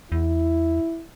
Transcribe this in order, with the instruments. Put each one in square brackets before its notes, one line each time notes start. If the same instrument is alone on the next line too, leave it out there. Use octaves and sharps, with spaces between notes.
[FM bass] E2 [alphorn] E4